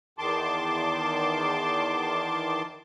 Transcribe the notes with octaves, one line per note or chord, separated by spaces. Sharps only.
E2 D#3 A5 C6 D6